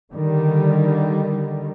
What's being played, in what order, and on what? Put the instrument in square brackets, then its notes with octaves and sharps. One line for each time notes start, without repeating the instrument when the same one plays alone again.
[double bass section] D3 D#3 G3